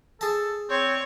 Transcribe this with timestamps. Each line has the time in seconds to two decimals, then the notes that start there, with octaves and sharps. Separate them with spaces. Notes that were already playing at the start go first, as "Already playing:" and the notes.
0.21 G#4 A4 A5
0.70 C4 C#5